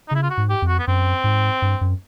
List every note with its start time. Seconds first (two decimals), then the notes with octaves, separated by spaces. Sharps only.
0.08 D#4
0.11 C#3 E4
0.23 F4
0.30 F#4
0.37 G#2
0.49 G4
0.62 F2
0.68 F#4
0.79 B3
0.87 F#2 C4
1.24 G#2
1.62 G2
1.81 F#2